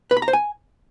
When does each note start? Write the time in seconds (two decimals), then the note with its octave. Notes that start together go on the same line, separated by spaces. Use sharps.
0.11 B4
0.17 B5
0.22 A#5
0.28 C5
0.33 G#5